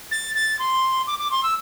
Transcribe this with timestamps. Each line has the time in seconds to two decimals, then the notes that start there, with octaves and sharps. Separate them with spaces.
0.11 A6
0.35 A6
0.59 C6
1.07 D6
1.19 D6
1.31 C6
1.43 E6